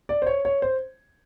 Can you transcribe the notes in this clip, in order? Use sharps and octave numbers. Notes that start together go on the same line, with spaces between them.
D5
C5
C#5
C#5
C5